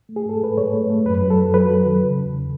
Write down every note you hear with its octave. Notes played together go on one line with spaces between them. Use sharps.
A3
G#4
G#2 A4
G#2 B4
G#2 C#5
A3
A3
F#2 B4
F#3
A4
F#2
F#3 B4
F#3
D#3
C#3
E2